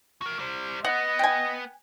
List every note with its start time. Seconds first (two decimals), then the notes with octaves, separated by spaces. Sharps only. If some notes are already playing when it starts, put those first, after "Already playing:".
0.22 F#4 A#4
0.39 G3 C5
0.85 B3 B4 D#5 F#5
1.19 G5 G#5